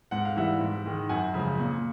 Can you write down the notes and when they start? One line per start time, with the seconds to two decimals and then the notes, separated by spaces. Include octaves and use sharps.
0.11 G#2 F#5
0.25 F5
0.36 E3 G3 E5 F#5
0.61 G#2
0.86 D#3 G#3
1.09 F#2 F#5 G#5
1.34 C#3 F3 G#3
1.59 A#2